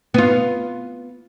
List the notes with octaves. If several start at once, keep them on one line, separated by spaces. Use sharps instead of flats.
B3 F4